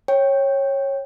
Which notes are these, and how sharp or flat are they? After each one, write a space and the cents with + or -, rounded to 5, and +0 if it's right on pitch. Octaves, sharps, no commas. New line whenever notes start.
C#5 -15 G5 +0